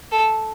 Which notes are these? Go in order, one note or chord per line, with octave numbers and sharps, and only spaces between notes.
A4